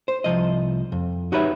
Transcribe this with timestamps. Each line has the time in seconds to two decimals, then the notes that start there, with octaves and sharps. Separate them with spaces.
0.08 C5
0.24 C2 C#3 F3 D#5
0.92 F2
1.32 D#4 F#4 G4 B4 C#5 E5